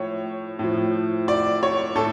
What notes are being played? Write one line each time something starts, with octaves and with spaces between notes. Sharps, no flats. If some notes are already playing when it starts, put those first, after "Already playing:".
Already playing: A2 F3 C#5
A2 F3
D5
C#5
A2 A4